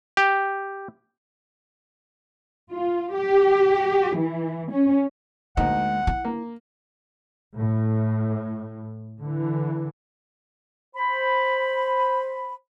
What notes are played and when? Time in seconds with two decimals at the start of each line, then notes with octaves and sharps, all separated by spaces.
0.17 G4
2.72 F4
3.15 G4
4.16 E3
4.71 C#4
5.57 D2 G#3 A#3 D#4 F#5
6.07 E4
6.25 A#3
7.55 A2
9.21 D3 E3
10.96 C5 B5